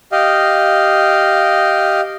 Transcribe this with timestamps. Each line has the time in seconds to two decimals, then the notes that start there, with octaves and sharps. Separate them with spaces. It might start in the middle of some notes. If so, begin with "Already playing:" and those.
0.12 G4 D#5 F5